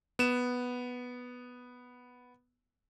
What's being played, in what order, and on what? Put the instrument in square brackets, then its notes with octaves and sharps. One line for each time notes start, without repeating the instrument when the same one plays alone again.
[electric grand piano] B3 E7